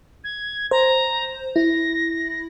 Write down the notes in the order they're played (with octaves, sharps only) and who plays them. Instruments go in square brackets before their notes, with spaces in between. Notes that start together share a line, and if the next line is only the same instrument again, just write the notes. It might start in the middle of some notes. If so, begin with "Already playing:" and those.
[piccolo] G#6
[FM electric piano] C5 [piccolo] A#5
[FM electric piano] E4 [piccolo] A#6